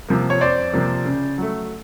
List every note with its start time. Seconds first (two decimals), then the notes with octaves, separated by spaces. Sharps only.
0.09 C3 F3 A#3
0.30 C#5
0.41 F2 C5 D5
0.73 C3 F3 A#3
1.05 C#3
1.38 F#3 A3